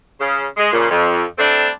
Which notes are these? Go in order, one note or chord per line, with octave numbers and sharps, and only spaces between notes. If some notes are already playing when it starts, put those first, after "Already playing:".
C#3
G#3
A#2 C#3
F2
G3 A3 C4 D4